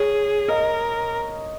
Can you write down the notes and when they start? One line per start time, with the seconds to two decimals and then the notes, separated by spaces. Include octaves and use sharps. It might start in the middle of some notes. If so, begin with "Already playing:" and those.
Already playing: G#4 C#5
0.48 A#4 D#5